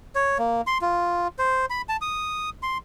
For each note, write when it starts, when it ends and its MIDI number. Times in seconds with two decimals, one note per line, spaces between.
0.15 0.38 73
0.38 0.61 58
0.67 0.78 84
0.81 1.28 65
1.39 1.66 72
1.70 1.82 83
1.89 1.97 81
2.01 2.50 87
2.63 2.78 84